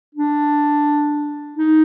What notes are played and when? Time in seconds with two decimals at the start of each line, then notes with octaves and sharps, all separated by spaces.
0.15 D4
1.57 D#4